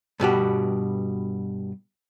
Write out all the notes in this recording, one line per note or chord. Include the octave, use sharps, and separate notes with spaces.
G2 B2 F#4 G4